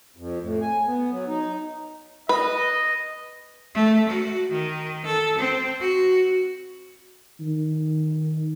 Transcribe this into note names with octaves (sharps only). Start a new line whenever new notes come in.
F2
A2
G#5
B3
F#3
D#4
B4 D#5
A3
F#4
D#3
A4
C4
F#4
D#3